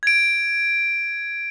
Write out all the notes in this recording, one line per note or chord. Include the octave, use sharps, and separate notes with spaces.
G#6 D7